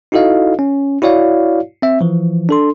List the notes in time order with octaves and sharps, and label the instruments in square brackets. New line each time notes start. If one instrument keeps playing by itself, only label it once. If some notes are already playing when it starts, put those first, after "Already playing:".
[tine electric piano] D#4 E4 F#4 A4 D#5 F5
C#4
E4 F#4 C#5 D5 F5
C4 E5
E3 F3
D4 A4 C6